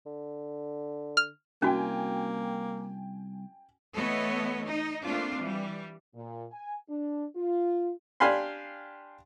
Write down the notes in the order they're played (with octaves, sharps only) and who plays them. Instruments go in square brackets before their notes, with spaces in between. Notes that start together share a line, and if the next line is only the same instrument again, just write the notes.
[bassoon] D3
[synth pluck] F6
[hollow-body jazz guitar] C2 [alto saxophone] A#3 [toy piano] C#4 F#4 [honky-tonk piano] G5 G#5
[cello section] E3 A3 B3 A4 C#5 D#5
D#4
A3 A#3 C4 D4 F4
E3 G3
[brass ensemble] A#2
G#5
D4
F4
[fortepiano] D4 G4 F5 G#5 B5 C6